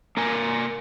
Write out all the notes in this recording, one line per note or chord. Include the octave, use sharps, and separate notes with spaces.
A#3 A#4 G#5